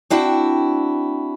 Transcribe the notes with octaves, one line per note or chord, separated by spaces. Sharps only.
C4 D4 E4 F#4 G5